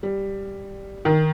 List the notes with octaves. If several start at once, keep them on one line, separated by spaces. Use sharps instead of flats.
G3
D#3